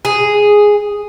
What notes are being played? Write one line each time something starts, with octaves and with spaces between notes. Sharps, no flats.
G#4